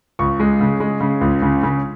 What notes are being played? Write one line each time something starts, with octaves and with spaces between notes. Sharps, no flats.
C#2 C#6
G#3
C#3
G#3
C#3
C#2
C#3
C#3